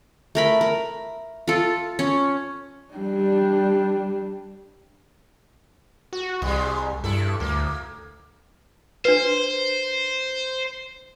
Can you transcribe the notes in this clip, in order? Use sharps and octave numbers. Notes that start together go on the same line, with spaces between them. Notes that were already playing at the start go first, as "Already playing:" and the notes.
A3 A#4 B5
A#4
F4 A4
C#4
G3 D4
F#4
C2 G3 G#3
G2 E4 A4
D2 A#3
D4 B4 C5